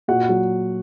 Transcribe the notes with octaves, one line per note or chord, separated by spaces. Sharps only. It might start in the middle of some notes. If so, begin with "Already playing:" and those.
A#2 F#4 F#5
F#3